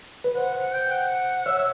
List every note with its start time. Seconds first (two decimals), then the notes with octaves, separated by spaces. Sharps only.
0.24 B4
0.36 C5 F#5
0.54 F#5
0.72 G5
0.91 F#5
1.46 C#5 E5